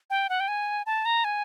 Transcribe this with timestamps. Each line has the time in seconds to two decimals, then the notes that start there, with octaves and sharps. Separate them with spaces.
0.10 G5
0.29 F#5
0.40 G5
0.48 G#5
0.86 A5
1.05 A#5
1.24 G#5